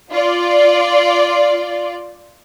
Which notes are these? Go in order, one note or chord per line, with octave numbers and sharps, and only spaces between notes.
F4 D5